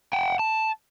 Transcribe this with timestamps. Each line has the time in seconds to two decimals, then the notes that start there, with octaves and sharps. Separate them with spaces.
0.13 F#5 G5
0.39 A5